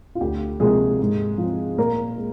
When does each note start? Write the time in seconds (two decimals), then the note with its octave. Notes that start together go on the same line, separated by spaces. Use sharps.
0.15 F4
0.21 D2 G4
0.60 C3 F3 G#3 A#3 G#4
1.00 G#2
1.38 F3
1.43 C4
1.77 A#2 A#3 A#4
2.18 G#3